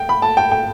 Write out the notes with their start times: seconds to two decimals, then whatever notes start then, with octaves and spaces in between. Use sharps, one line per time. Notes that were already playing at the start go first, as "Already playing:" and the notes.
Already playing: G5
0.09 B5
0.22 A5
0.37 G5
0.52 G5